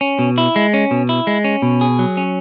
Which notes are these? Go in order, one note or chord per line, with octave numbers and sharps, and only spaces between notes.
C#4
B2
E4
G#3
C#4
B2
E4
G#3
C#4
B2
G#4
F#3
C#4